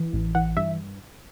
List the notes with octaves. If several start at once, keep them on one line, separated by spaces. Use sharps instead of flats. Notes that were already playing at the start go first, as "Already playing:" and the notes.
Already playing: E3
A1
E3 F#5
G2 E5